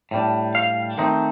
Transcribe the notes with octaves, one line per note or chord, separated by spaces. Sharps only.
A2 G3 D4
F5
D#3 A3 C4 D#4